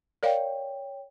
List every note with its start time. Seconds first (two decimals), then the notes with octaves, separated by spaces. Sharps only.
0.23 A#4 C#5 D5 F5 G5